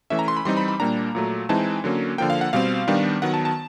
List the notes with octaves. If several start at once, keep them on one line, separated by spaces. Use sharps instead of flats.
E3 A3 C#4 E5
A#5
C6
B5
E3 G3 C4 D#4 C6
B5
B5
A#2 G3 A#3 D4 A#5
A#2 F#3 A3
E3 G#3 C4 D#4 A5
D3 F#3 A#3 C#4
D3 F3 A#3 G5
F5
F#5
B2 G3 C4 F5
D#3 G3 B3 D4
D#3 F#3 B3 F#5
A5
A5